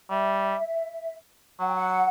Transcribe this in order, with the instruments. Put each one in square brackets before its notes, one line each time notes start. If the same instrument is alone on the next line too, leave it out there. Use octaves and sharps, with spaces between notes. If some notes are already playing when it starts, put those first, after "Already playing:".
[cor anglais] G3 [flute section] E5
[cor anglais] F#3 [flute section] F#5
[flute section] G5
F#5